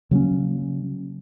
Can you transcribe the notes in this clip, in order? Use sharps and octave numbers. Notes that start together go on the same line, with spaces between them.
C#3 F#3 A#3 C#4